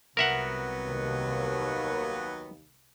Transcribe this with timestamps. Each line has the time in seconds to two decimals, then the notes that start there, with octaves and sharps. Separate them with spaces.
0.17 C2 C3 F#3 B3 A#4 E5 F#5
0.86 D#2